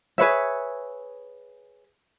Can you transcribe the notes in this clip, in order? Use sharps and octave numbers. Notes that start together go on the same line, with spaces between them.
G#4 B4 C#5 E5